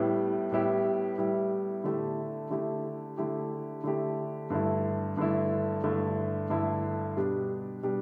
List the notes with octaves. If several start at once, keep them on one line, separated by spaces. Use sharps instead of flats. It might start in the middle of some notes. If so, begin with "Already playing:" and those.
Already playing: A2 G3 B3 E4 G4
A2 G3 B3 E4 G4
A2 G3 B3 E4 G4
D3 A3 E4 G4
D3 A3 E4 G4
D3 A3 E4 G4
D3 A3 E4 G4
G2 D3 A3 E4
G2 D3 A3 E4
G2 D3 A3 E4
G2 D3 A3 E4
B2 G3 D4 G4
B2 G3 D4 G4